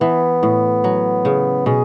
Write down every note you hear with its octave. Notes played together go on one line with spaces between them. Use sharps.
E3 B3
A2
F#3
C#3
B2 G#4